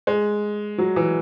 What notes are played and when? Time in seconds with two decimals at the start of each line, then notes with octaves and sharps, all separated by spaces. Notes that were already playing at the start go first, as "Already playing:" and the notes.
0.07 G#3
0.78 F#3
0.96 E3